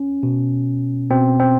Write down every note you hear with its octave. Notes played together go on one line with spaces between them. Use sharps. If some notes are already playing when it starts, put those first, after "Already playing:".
Already playing: C#4
B2
B2 C4
C4